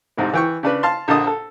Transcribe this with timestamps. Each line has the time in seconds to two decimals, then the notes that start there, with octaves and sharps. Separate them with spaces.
0.18 A1 G#2 C3
0.33 E3 G5 C#6
0.63 C#3 D4 B4
0.83 F5 A5 C6
1.08 A#1 D3 D#5 A5 D#6
1.27 A4